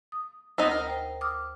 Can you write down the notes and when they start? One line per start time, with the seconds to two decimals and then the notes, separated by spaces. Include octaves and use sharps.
0.12 D#6
0.58 D2 B3 C4 D#4 A#6
0.71 A#4
0.86 C5 G5
1.21 D6 D#6 F6